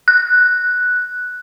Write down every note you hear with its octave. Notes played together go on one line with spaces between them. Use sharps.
F#6